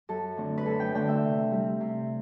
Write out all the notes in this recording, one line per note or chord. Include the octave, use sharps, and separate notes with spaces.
F#2 A4
D3 A3 C4
B4
F#2 A4
G5
D3 A3 C4 G5
E5
C3
G3 C4
C3